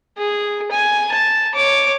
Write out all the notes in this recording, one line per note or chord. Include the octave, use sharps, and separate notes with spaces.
G#4
G#5
A5
C#5 D6